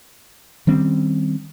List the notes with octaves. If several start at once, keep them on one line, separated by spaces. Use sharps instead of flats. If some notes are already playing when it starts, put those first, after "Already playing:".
D#3 G3 C4 C#4